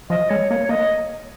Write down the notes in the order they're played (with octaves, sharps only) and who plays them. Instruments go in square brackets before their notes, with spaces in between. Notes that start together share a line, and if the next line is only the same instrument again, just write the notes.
[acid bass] F3 [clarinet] D#5
[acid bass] G#3 [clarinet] C#5
[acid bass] A#3 [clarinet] C#5
[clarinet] C#5
[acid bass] A#3 [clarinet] D#5